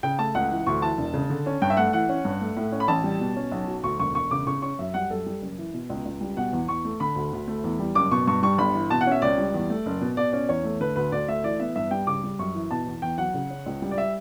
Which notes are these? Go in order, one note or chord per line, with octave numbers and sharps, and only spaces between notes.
C#3 G5
A3 A5
C#2 F#5
E3
D2 C#6
E3 A5
E1
C#3
D3
C#4
G2 G5
E5
A3 F#5
E3 F#5
C#4
G2
A3
A2
C#4
B5
A1 A5
G3
B2
C#4
B1
F#3
D2 C#6
E1 C#6
E1 C#6
C#3 D6
C#3 C#6
C#4 C#6
F#2 E5
G3 F#5
F#2 A4
G3
F#1
E3
B2
C#2
C#2
G3
B2 F#5
E2
E2 C#6
A3
D3 B5
D2
D2
A3
E2
G3
F#1 D6
B2 C#6
G2 C#6
G3 C#6
G1 B5
E3
B2 A5
F#5
C#4 E5
C#2 D5
G3
E2
A3
F#1
B2
B2 D5
C#4 D5
E2 C#5
A3
D3 B4
D2 B4
D2 D5
A3 E5
E3 D5
B3 E5
G2 E5
G3 G5
C#3 D6
G3
F#2 C#6
E3
B2 A5
E2
E2 G5
F#3 F#5
C#3
C#4
C#2
G3
D5
E5